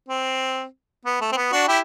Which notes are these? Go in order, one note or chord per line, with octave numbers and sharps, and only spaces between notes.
C4
B3
A3
C4
B3
D4 F#4
E4 G4